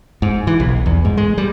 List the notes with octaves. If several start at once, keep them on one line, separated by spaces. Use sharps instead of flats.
G#2
E3
B1
E2
G#2
G#3
G3